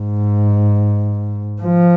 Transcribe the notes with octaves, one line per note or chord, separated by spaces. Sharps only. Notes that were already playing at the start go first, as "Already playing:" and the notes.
Already playing: G#2
F3